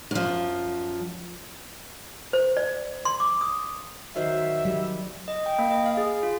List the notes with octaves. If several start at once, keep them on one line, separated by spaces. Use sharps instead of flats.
F#2 F3
C5
D5
C6
D6
D#6
D#3 F#3 C5 E5
F#3 G3
D#5
G5
A#3
D#5
F5
G#4
F4